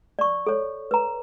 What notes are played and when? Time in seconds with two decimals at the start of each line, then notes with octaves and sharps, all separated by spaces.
0.19 D5 C#6
0.47 A4 C#5
0.91 B4 A#5